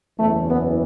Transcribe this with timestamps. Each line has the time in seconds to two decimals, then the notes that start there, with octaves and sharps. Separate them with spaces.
0.19 F#1 E2 E3 A3
0.48 B3